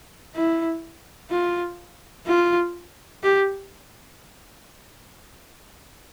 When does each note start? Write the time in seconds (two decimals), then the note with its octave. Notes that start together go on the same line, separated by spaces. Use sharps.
0.36 E4
1.31 F4
2.27 F4
3.23 G4